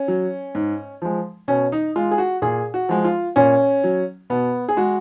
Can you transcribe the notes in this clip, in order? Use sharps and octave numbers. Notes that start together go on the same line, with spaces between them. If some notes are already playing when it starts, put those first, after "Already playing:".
Already playing: C#4
F#3
G#2
F3 G#3
B2 C#4
D#4
G#3 F4
G#4
F#4
A#2 G#4
F#4
F3 G#3
F4
A#2 C#4
F#3
B2 B3
G#4
G#3 F#4